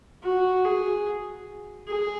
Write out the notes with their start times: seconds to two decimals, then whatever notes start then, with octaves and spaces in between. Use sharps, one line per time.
0.23 F#4
0.65 G#4
1.88 G#4